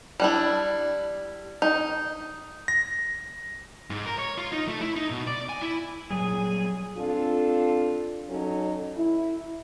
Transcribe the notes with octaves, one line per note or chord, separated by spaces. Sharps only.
G3 D4 E4
D#4
A#6
G#2
A#4
C#5
F4
D#4
A3
E4
D#4
B2
D5
G#5
E4
A#2 F#3 G3 G#4 G#5
C4 D4 F4 A4
F#3 C#4 D#4 A4
E4